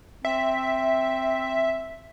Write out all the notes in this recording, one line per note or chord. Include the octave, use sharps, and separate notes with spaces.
C4 E5